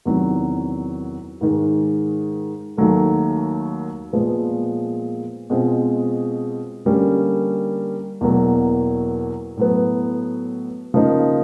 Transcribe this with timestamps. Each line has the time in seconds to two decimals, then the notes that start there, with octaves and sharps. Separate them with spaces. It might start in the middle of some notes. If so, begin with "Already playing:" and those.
0.05 E2 C3 D#3 F#3
1.41 G#2 D#3 G#3
2.77 D#2 D#3 F#3 A3
4.13 A#2 F3 G#3 B3
5.50 B2 G#3 C4 F4
6.85 D3 G3 A#3 C#4
8.21 E2 B2 F#3 A#3
9.57 A2 F#3 B3
10.94 C#3 F3 A#3 D#4